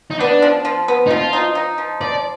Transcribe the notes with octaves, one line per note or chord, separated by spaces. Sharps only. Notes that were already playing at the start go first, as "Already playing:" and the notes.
D#4
B3 D4
F3
F3
B3
D#4
F3 F4
D#4
D#4
F3
F3 D5